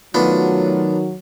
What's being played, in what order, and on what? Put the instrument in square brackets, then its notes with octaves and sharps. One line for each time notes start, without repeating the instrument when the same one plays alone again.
[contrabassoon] D#3 [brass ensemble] F#3 [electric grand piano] A3 F4 [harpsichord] B3 D4